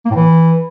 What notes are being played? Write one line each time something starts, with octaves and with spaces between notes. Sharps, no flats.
A#3
A2
E3